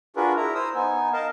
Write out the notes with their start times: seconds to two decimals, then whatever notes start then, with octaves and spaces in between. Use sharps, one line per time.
0.16 D4 F4 F#4 G#4 A#4 B4
0.36 E4 A#4 A#5
0.54 C5 D#6 E6
0.75 B3 D#4 G#5
1.13 A#4 D#5 F5 A5